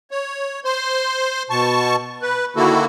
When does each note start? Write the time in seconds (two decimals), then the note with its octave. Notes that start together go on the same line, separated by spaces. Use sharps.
0.11 C#5
0.65 C5 C6
1.50 B2 A5 C#6
2.22 B4
2.56 D3 D#3 A#3 E4 F#4 A4